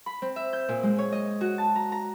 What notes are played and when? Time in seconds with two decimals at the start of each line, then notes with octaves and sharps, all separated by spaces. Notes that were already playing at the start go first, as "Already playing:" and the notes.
0.06 B5
0.22 C4
0.36 E5
0.53 G6
0.68 A#2
0.83 G#3
0.99 C#5
1.12 D#5
1.41 F#4
1.58 A5
1.76 A#5
1.92 A#5